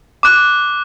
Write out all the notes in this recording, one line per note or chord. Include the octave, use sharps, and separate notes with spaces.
D6 F#6